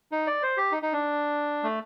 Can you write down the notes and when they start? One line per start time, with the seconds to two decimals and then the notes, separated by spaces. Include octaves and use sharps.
0.12 D#4
0.27 D5
0.43 C5
0.57 G4
0.72 D#4
0.83 D#4
0.93 D4
1.63 A3